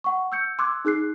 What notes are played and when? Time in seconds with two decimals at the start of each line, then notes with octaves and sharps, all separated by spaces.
0.04 F#5 C#6
0.32 E6 G6 C#7
0.59 C6 D6 E6 F#6 G#6
0.85 D#4 G#4 F#6 C7